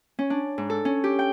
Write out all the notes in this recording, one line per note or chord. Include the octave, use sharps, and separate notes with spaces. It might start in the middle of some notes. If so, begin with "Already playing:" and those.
C#4
D4
G#2
A4
C#4
G4
G5